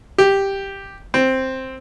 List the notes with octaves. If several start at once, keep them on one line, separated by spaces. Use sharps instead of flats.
G4
C4